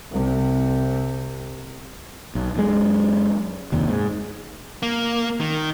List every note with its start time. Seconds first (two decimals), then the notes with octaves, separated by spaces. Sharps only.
0.12 C2 C3
2.35 B1
2.56 F#2 G#3
3.72 F1 D#2 D#3
3.89 G#2
4.83 A#3
5.40 D#3